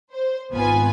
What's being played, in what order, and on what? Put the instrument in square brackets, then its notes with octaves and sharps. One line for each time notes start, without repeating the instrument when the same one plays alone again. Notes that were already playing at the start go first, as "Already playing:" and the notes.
[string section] C5
G#1 B3 F4 B4 G#5